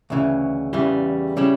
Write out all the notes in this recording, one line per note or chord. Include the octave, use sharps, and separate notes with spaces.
D2 C#3 E3
E2 C#3 E3 G3
C#3 G3 C#4 E4